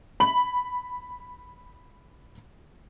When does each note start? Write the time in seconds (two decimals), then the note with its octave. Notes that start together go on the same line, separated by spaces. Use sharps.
0.20 B5 F#7